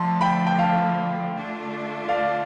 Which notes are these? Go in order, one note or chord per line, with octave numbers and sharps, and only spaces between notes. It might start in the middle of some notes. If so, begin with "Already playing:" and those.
Already playing: D3 F3 A3 A5 C6
G5 B5
G5
F5 A5
D3 A3 D4 F4
D5 F5